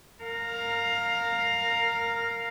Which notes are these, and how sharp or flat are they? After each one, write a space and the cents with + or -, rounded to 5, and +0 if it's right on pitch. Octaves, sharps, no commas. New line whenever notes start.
A#4 -10 F5 +10